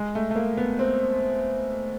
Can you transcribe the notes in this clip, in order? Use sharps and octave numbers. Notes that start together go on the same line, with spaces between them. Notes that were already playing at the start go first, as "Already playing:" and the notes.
Already playing: G#3
A3
A3
A#3
B3
C4